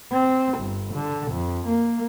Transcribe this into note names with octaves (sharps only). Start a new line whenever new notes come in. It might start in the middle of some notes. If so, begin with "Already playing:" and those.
C4
G1
D3
F2
A#3